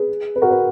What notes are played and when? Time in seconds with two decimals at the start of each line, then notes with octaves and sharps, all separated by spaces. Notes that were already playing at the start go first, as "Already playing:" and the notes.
Already playing: G#4 B4
0.36 B4
0.42 F#4 A#4
0.51 B4